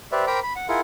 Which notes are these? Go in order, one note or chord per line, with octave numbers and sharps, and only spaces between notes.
G4 B4 C5 D5 E5
A#4 C5 G5 A#5 B5 D6
B5
F#5
E4 F4 G#4 A#4 F#5